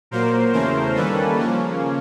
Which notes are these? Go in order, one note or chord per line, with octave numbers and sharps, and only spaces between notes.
A#2 F#3 A#3 A#4 C5
E2 C#3 E3 A3 C#4 A#4 C5
D#3 G3 A#3 C#4 A4 B4
C#3 F3 A#3 C#4